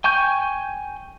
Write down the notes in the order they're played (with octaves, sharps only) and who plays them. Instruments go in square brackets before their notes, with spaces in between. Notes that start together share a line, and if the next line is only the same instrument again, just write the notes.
[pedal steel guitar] G5 G#5 C#6 G6